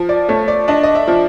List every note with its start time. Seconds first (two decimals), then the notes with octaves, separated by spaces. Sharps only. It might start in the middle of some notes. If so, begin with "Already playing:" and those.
Already playing: F3
0.09 D5
0.29 A3 C#5
0.48 D5
0.68 D4 D#5
0.83 D#5
0.95 E5
1.07 F3